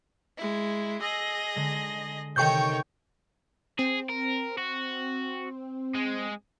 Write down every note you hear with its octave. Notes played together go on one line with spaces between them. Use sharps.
G#3 E4
G#4 D#5 E6 A#6
D3 G#3
C3 D#3 A4 C#5 D#5 G5 C#6 G6
C4 G#4
A#4
F#4
G#3